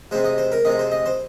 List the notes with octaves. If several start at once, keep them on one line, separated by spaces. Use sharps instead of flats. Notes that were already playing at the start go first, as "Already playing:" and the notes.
C3 G#3 C5
D#5
C5
A#4
C3 G#3 D#5
C5
D#5
C5